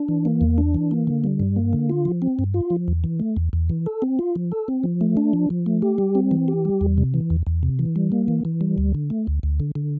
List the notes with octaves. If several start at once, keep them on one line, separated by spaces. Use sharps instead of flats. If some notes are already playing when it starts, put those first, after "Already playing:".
Already playing: D4
E3
A#3
E2
D4
E3
A#3
D3
G3
G2
A#3
D3
F4
F3
C4
G2
F4
F3
E2
E3
A3
E2
E2
E3
A4
C4
F4
F3
A4
C4
F3
A3
D4
F3
F3
A3
G4
G3
C4
E3
G4
G3
E2
C3
E3
E2
E2
C3
E3
G3
A#3
E3
E3
G3
D2
D3
A3
D2
D2
D3
D3